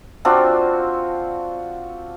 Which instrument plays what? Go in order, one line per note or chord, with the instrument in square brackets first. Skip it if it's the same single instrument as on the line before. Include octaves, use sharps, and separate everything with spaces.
[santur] C4 D4 F4 F#4